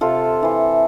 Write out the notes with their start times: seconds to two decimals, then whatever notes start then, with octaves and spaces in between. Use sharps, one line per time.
0.01 C3 F4 A4
0.43 E3 C5